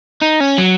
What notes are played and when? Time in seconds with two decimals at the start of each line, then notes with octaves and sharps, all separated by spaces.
0.21 D#4
0.40 C#4
0.58 F#3